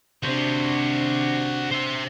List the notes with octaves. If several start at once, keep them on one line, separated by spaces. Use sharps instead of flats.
C3 D4 F#4 C5
C5 E5